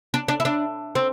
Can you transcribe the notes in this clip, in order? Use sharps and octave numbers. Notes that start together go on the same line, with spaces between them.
D4
D4
E4
D4
C4